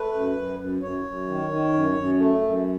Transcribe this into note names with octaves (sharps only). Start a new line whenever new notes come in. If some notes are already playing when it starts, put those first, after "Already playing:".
Already playing: A3 B4
F#2
F#2
F#2
F#2 C#5
F#2
D#3
D#3
F#2
F#2
A3
F#2